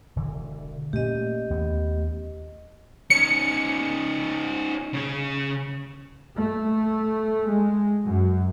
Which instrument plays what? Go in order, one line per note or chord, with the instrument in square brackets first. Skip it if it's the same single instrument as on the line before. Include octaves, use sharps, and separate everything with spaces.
[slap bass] E1 D3 E3
[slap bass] A#2 [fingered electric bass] A3 C#4 [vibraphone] G4 D#5
[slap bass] D#2 B3
[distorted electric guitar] C#4 D#4 [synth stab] C#7
[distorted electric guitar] C#3 C#5
[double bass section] A3
G#3
F#2